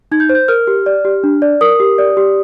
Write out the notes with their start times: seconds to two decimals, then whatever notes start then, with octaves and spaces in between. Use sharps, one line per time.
0.12 D#4 G#6
0.20 G6
0.29 C5
0.35 G6
0.48 A#4 F6
0.67 G4
0.86 D5
1.05 G4
1.24 D4
1.42 D5
1.61 A#4 D#6
1.80 G4
1.98 D5
2.17 G4